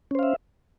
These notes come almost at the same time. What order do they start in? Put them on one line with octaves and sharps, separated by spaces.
C#4 C5 F5 E5